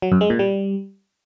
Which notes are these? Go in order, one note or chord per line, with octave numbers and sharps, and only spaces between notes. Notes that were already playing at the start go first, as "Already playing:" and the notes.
F#3
F#2
G#3
A#2
G3